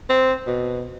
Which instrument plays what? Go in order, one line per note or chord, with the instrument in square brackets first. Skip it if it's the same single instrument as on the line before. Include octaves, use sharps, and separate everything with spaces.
[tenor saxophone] C4
B2